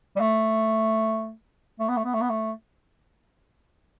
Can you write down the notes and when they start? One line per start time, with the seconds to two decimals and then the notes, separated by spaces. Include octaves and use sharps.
0.16 G3
0.20 A3
1.80 A3
1.89 B3
1.97 A3
2.05 B3
2.14 A3
2.21 B3
2.30 A3